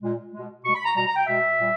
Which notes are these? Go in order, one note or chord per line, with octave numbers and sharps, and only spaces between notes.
A#2 G#3
B2 G#3
B2 G#3 C#6
B5
A#5
B2 G3 A#5
A#5
G5
B2 G#3 E5
A#2 G3